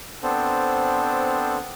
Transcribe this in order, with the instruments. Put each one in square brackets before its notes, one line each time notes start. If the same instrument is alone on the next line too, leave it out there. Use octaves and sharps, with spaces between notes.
[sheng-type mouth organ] B3 C4 D4 A4 C5